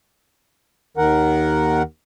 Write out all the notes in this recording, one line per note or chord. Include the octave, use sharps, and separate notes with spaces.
D#2 D#3 A#4 F#5